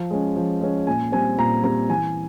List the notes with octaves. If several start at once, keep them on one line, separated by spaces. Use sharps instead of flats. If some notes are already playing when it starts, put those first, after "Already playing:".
Already playing: F3
G#3 C#4
F3
G#3 C#4
A#2 G#5
G3 C4 G#5
A#2 A#5
G3 C4 A#5
E3 G#5